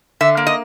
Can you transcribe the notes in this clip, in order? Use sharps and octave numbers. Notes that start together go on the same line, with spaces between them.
D3 E5
A#3
D#5